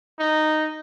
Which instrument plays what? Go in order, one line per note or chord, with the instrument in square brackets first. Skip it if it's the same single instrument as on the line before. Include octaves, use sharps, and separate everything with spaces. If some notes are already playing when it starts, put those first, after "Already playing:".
[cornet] D#4